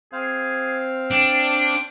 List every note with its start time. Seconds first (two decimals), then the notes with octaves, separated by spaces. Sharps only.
0.13 C4 G#4 C5 F5
1.11 D4 G5